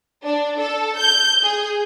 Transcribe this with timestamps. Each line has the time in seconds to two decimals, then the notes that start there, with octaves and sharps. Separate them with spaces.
0.24 D4
0.59 A4
0.98 G6
1.42 G#4